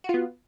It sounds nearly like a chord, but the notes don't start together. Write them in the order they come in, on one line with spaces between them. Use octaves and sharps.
F#4 F4 B3